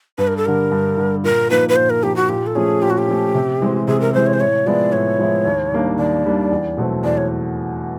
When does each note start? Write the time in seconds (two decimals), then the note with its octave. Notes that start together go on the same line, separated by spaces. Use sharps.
0.18 G2 B4
0.27 A#4
0.37 A4
0.45 D3 G3 A#4
0.71 G2
0.97 D3 G3
1.24 A#2 A#4
1.50 F3 A#3 D#4 B4
1.69 B4
1.76 A#2 C5
1.90 A#4
2.03 F3 A#3 D#4 G4
2.16 F#4
2.29 A#2 G4
2.47 A4
2.55 F3 A3 C#4 G#4
2.82 A#2 G4
2.90 F#4
2.98 G4
3.08 F3 A3 C#4
3.34 C3
3.61 E3 G#3 C4
3.87 C3 G#4
4.01 A#4
4.13 E3 G#3 C4 C5
4.27 C#5
4.33 C5
4.40 A2 C#5
4.66 F3 G#3 B3 E4 D5
4.92 A2 C#5
5.19 F3 G#3 B3 E4
5.45 D#2
5.72 D#3 G3 A#3 D4
5.98 D#2 D5
6.25 D#3 G3 A#3 D4
6.51 E2
6.77 B2 F#3 A3 C4
7.04 E2 D5
7.17 C#5